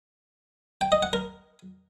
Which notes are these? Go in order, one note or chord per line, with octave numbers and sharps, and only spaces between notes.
G5
D#5
F#5
A#4